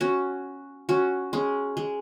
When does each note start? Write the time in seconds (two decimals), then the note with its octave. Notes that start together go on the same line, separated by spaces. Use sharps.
0.01 C#4 F#4
0.89 C#4 F#4
1.33 G#3 C#4
1.77 G#3